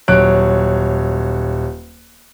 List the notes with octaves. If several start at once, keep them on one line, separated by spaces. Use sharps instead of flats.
D#1 F#3 C#5 F#6 D7